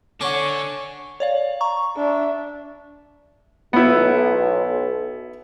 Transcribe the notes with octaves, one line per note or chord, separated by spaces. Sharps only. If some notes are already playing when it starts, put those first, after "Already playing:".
D3 C#4 F#5 C#6 D6
C#5 D5 F5
A#5 C#6
D4 E5
B1 B3 E4